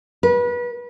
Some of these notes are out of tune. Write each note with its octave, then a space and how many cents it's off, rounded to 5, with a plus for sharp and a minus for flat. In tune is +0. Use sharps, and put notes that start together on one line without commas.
B4 -30